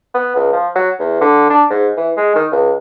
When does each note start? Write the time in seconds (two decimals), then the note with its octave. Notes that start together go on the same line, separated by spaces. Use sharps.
0.14 B3
0.36 C#2
0.53 F3
0.75 F#3
0.99 E2
1.21 D3
1.50 D4
1.70 G#2
1.97 E3
2.17 G#3
2.35 D#3
2.51 C#2